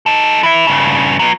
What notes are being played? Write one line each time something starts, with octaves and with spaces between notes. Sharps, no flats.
D#4 A4
E3 E4
G2 C#3
F#3 B3